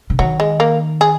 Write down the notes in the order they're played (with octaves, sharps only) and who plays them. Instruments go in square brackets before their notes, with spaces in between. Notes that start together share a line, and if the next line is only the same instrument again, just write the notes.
[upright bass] C#3
[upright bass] D#3 [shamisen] F#3
[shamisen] G#3
A#3
G#4